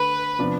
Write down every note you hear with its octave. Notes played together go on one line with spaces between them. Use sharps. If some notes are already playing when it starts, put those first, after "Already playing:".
Already playing: D3 A3 B4
C3 F3 B3 D4